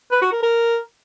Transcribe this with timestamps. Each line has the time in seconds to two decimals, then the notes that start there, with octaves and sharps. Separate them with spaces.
0.12 B4
0.22 F#4
0.32 A#4
0.43 A#4